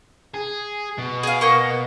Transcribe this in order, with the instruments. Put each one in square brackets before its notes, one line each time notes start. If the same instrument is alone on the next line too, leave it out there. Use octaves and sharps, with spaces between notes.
[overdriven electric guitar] G#4
B2
[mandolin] G#4 F5
A#3 D#5 C#6